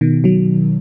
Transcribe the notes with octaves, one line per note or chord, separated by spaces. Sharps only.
B2 D#3
D#3 F#3